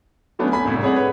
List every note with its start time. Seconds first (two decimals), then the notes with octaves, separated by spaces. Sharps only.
0.39 F#3 A3 B3 C#4 D4
0.52 G#5 B5 B6
0.65 C2 A2 C3
0.83 G#4 C#5 D5 F#5
0.96 B4 C#5